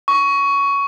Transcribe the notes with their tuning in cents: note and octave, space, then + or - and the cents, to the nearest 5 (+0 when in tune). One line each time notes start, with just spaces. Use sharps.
C#6 +15